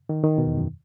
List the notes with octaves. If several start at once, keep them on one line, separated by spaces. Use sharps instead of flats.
D#3
D#3
B2
E2
F#2